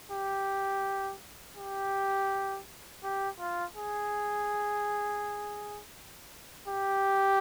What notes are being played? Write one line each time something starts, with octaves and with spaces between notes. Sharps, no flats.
G4
G4
G4
F4
G#4
G4